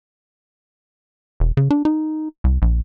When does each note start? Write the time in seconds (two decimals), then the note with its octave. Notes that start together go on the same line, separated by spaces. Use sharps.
1.40 E1
1.57 C#3
1.71 D4
1.85 D#4
2.44 C2
2.62 A#1